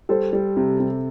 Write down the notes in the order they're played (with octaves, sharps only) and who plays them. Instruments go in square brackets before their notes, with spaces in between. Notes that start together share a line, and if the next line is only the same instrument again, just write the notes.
[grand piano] G3 [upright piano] A4 C5
[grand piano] G3
C3
C3